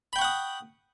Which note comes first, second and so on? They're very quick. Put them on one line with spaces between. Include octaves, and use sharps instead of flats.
B5 G5 C#6 F#5 D#6